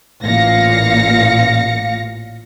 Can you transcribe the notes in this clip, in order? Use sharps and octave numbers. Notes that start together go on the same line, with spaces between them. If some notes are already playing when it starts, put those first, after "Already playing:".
A1 A#2 F5 A#6 C#7